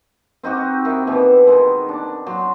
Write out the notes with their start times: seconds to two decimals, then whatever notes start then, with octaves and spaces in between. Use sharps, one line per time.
0.43 C4 D#4 F#4 G4
0.85 D#3 E4
1.07 B2 E3
1.47 D#3 G#3
1.89 D4
2.27 F#3 C6